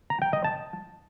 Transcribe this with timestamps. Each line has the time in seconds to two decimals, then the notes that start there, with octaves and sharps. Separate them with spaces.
0.10 A#5
0.22 G5
0.33 D#5
0.44 A5